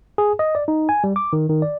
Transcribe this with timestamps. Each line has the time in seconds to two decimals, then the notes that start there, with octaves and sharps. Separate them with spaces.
0.18 G#4
0.39 D#5
0.55 D5
0.68 D#4
0.89 G#5
1.04 G3
1.16 D6
1.33 D#3
1.49 D#3
1.62 D5